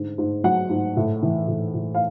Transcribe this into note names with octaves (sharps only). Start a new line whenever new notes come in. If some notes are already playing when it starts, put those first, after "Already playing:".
Already playing: G#2 D3
G#2
F#3 F#5
G#2
A2
E3
A2
A2
F5